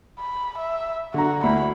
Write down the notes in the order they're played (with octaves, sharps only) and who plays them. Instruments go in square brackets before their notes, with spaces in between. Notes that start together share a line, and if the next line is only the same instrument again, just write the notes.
[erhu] B5
E5
[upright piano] D3 A#5 [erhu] F#4
[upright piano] D2 E4 [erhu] B5